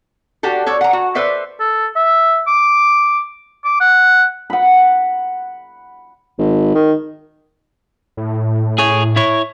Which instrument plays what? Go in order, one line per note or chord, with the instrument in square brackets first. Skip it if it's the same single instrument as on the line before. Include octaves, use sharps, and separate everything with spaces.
[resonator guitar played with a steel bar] D4 F#4 G4 A4
A4 C#5 D5
F#5 A#5
F#4
A4 B4 C5 D5 E5
[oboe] A4
E5
D6
D6
F#5
[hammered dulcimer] F#5 B5
[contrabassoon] G#1
D#3
[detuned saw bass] A2
[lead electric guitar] G#4 C#5
E4 C#5